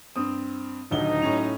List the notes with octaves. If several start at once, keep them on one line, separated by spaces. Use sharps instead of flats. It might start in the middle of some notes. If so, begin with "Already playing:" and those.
G2 C4 D#6
D#1 D2 F#3 D#4 G7
A2 C#4 F7